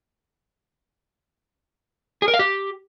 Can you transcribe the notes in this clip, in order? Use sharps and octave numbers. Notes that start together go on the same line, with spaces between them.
G#4
A#4
F5
G4